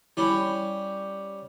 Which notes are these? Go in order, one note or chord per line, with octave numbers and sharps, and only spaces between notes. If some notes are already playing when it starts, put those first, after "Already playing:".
G3 C#4 E4 B5